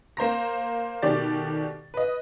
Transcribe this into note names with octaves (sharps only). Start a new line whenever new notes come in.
A#3 C5 A#5 A#6
B2 D#3 A3 G4 D5 A6
B4 D#5